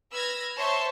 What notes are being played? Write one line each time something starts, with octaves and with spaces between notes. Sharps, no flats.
B4 E6 F6 G#6 A#6
C5 C#5 E5 A5 C6 C#6